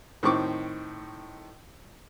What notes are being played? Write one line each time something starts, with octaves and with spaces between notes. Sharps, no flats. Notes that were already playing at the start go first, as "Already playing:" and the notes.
A2 D#3 C4 C#6 D6